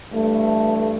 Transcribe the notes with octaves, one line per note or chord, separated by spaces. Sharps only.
G2 E3 A3